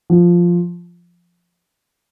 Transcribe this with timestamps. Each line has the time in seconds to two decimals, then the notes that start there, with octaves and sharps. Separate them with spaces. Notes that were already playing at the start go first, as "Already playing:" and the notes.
0.10 F3